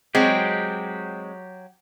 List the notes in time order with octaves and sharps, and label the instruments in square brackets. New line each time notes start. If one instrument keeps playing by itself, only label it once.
[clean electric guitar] F#3 F#4 G4 [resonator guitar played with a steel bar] G#3 C4